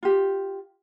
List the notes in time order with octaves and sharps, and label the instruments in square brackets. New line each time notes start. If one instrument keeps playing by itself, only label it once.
[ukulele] F4 G4